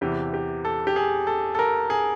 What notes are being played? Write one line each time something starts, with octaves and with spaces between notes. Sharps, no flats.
E2 C3 E3 G4
G4
A4
G4
G#4
A4
A4
A#4
G#4